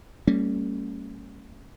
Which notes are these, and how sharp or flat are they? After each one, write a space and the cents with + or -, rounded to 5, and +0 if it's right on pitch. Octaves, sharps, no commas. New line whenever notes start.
G3 +0 A#3 -45 C#4 +0